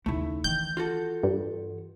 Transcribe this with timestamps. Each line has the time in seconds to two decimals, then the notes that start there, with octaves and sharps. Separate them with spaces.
0.06 D#2 C#3 A3 E4
0.44 D#3 E3 G6
0.77 F4 F#4 A4
1.23 G2